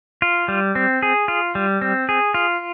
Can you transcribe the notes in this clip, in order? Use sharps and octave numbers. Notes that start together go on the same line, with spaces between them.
F4
G3
C4
G#4
F4
G3
C4
G#4
F4